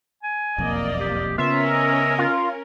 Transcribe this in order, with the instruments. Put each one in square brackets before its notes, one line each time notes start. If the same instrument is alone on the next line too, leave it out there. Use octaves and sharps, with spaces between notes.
[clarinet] G#5
[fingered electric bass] E1 B1 F2 [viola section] A#3 D5 D#5
[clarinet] G4
[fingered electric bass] C#3 B3 [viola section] C#4 A#4 [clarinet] F4 [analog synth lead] E5
[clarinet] D#5
[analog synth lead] F4